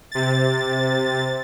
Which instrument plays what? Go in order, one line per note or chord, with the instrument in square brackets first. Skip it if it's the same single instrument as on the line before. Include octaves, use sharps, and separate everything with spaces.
[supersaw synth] C3 A6